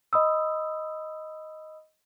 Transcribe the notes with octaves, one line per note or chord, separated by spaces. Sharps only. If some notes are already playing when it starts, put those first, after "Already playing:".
D#5 B5 D#6 E6